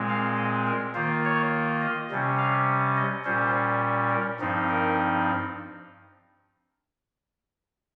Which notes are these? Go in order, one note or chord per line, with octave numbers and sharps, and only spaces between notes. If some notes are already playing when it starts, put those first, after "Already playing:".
Already playing: A#2 G#3 C4
F5
D#5
A#4
D#3 A#3 F4 C5
C#5
D#5
C3 G3 C#4
F5
D#5
A#2 G3 C#4 C5
A#4
G2 F3 C4 D#4
A#4